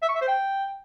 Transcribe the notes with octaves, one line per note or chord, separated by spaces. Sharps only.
E5
C#6
E5
C5
G5